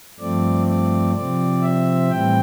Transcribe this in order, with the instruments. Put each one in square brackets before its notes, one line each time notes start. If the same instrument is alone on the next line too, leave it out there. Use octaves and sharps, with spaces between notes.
[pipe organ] G2 F3 A3 C4 D5
D5
C3 F3 C4 D5
E5
A2 E3 G3 C4 G5